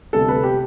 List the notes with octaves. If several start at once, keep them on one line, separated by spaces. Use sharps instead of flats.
D2 C3 G3 B3 A4
B4
G4